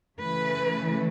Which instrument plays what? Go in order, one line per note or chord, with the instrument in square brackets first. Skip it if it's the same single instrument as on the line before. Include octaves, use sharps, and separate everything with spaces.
[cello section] C#3 E3 A3 B4